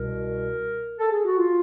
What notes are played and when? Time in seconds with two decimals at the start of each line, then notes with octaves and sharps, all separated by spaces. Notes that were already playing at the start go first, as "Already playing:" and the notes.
Already playing: C2 B2 A#4
0.98 A4
1.11 G#4
1.25 F#4
1.37 F4